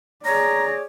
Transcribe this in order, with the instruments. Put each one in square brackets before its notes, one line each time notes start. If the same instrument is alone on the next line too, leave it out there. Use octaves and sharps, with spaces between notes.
[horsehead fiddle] G#4 D5 [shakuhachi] C#5 [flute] A#5 [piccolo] A#6